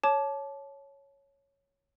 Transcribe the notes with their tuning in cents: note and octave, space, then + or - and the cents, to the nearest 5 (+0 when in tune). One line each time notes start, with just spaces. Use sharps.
C#5 +0 A5 -25 D6 +0